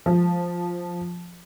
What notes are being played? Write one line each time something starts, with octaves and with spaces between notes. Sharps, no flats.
F3